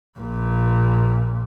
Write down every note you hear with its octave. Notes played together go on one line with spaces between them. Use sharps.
A#1 A#2